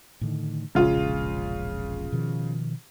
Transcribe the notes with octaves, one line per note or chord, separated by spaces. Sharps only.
A2 D3 D#3
E1 A#1 C#3 G#3 F4
B2 D#3 F3